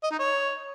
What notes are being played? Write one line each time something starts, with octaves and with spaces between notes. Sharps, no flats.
D#5
D#4
C#5